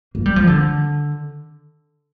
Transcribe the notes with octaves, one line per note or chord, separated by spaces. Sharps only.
A#3
G3
F3
D3